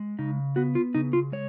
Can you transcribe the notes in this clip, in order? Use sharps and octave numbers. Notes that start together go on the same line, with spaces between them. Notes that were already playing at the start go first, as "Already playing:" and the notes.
Already playing: G#3
C#3 D#4
B3 F#4
F4
C#3 D#4
F4
G#3 C#5